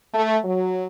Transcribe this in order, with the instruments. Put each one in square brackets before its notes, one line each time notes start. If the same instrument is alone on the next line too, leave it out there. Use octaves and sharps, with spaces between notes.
[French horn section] A3
F#3